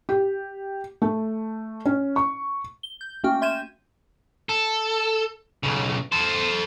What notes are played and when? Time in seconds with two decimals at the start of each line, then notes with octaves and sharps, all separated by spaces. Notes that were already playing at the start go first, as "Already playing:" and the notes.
0.09 G4
1.02 A3
1.86 C#4
2.16 C#6
2.83 G7
3.01 G6
3.24 A3 A#3 C#4 F#4 G5 F6
3.42 E5 C6 G6 G#6 D#7 E7
4.49 A4
5.63 B1 C#3
6.12 A4 C5